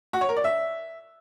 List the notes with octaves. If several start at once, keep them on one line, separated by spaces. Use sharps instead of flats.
F#4
C#5
A#4
D5
E5